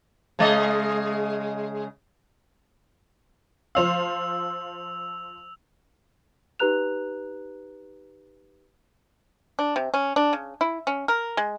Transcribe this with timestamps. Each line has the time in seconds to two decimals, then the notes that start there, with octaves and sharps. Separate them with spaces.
0.39 C#3 G#3 D#5
3.75 F3 C5 F5 E6 F7
6.59 D#4 G4 B4 A#5 F#6 F7
9.59 D4
9.76 C3
9.94 C#4
10.16 D4
10.33 C#3
10.61 E4
10.87 C#4
11.08 A#4
11.37 G#3